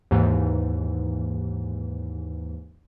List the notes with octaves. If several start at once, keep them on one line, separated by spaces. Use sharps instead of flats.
D#2 G#2 E3